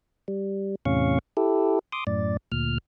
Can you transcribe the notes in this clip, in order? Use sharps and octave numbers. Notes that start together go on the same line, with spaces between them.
G3
E2 A2 C3 C#4 F5 C#6
E4 G4 A4
C6 D6 D#6
F#2 A2 D5
D2 A#2 F6